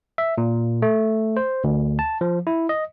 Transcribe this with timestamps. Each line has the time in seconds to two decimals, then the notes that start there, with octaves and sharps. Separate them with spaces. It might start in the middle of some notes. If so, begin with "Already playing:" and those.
0.18 E5
0.38 A#2
0.82 A3
1.37 C5
1.64 D2
1.99 A5
2.21 F3
2.47 E4
2.69 D#5